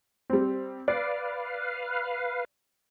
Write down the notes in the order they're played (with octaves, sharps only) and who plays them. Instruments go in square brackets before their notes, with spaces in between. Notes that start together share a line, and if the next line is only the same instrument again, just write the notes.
[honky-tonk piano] G3 C4
[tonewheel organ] B4 F5 [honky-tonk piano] D5